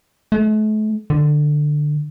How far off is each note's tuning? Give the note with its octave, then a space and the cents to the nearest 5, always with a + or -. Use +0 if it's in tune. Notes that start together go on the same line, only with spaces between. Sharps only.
A3 -40
D3 +15